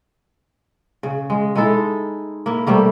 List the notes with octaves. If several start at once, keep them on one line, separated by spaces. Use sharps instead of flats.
C#3
G#3
G#3 D#4 E4 A4
A#3 E4
C3 G3 A3 A#3